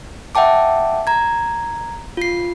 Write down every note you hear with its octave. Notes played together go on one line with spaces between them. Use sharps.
E5 F#5 G5 A5 D6
A#5 G#6
F4 C7